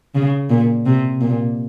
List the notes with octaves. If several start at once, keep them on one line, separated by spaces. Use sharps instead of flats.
C#3
A#2
C3
A#2